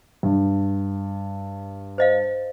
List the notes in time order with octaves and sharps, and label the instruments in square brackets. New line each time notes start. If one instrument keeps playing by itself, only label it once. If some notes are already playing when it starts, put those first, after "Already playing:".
[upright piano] G2
[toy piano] C5 D#5 F5